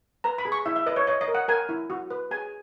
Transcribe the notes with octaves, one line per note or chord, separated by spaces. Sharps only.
B4 A#5
B5
G#4
C#6
E4 E5
E5
B4 D#5
C#5
C#5 D#5
D#5
A#4
F#5
A#4 G#5
E4
F#4
B4
G#4 G#5